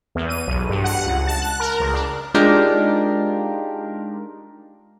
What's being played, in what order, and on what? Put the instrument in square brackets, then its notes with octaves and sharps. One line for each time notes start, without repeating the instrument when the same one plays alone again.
[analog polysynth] E2
D#7
B1
G2
F#5
C#2
A5
F#6
A#4
C#2
D4
[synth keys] G#3 D4 D#4 F4 G4 A#4